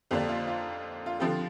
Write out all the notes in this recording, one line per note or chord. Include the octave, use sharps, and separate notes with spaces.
F2 D3 A#3 D4 G4
F4
F4
F4
D3 F3 C4 G4